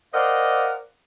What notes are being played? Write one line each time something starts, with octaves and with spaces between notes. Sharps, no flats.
A#4 C5 D5 D#5 F5 F#5